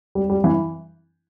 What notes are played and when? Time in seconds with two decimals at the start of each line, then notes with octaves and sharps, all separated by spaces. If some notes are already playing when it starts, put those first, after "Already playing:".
0.15 G3
0.30 G3
0.44 E3